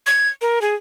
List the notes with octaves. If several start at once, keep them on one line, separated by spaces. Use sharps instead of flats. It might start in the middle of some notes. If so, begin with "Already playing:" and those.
G#6
A#4
G#4